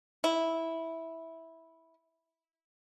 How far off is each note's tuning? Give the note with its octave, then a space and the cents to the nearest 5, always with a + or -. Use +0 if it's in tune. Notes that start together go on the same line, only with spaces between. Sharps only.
E4 -10